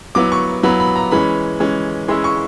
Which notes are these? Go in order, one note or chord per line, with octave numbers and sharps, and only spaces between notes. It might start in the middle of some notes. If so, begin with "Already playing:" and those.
F#3 B3 E4 D6
C#6
F#3 B3 E4 B5
B5
A#5
E3 G#3 C#4 B5
E3 G#3 C#4
E3 G#3 C#4 E4 C6
C#6